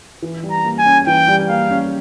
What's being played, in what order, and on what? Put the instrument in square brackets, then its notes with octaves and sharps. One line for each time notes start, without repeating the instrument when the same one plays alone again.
[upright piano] E3
G3
[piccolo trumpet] A#5
[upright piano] A#3
[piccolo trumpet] G#5
[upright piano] C#4
[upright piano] E3 [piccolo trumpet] G5
[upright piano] G3
[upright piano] A#3 [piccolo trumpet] F5
[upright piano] C#4